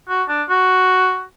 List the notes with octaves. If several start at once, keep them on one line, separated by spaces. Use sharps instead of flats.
F#4
D4
F#4